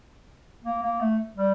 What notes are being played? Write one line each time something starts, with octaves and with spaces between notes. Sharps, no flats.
A#3
A#3
A3
G3